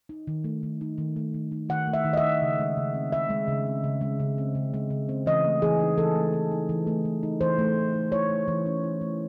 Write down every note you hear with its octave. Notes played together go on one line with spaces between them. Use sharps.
D#4
D#3
A3
D#3
D#4
D#3
A3
D#3
D#4
D#3 F#5
A3
E5
D#3
D#5
E5
D#4
C#3
G#3
C#3
C4
C#3 E5
G#3
C#3
C4
C#3
G#3
C#3
C4
C#3
G#3
C#3
C4
E3 D#5
A3
E3 G#4
D#4
E3 A4
A3
E3
D#4
E3
A3
E3
D#4
E3 C5
A3
E3
D#4
E4 C#5
A3
E3
C#4
E4
A3